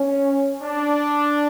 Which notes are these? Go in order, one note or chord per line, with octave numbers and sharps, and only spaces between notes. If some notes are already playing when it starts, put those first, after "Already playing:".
Already playing: C#4
D4